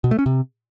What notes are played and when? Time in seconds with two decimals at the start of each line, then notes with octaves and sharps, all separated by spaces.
0.04 B2
0.11 A3
0.19 C#4
0.26 C3